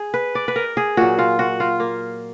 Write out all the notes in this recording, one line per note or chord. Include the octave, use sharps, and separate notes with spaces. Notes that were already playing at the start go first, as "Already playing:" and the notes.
Already playing: G#4
B4
D5
B4
A#4
G#4
A#2 F#3 F#4
F4
F#4
F4
A#3